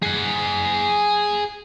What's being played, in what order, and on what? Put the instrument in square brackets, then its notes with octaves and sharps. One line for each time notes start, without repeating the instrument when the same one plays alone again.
[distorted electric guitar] G#4 F#5